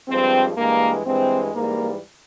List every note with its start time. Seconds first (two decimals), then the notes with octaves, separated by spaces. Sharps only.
0.08 G2 F3 G#3 C4
0.56 G2 E3 G#3 A#3
1.05 G2 E3 G#3 C4
1.54 G#2 E3 G3 A#3